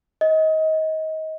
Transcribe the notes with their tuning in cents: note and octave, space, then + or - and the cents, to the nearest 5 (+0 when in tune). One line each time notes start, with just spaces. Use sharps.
D#5 +25